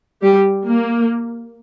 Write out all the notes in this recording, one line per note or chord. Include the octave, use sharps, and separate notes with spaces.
G3 G4
A#3